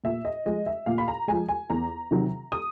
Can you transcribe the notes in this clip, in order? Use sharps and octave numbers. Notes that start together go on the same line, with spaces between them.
A#2 E5
D#5
F3 G#3 D#5
E5
A#2 F5
B5
A#5
F3 G#3 G#5
G#5
E2 A#5
C3 D#3 F#3
D#6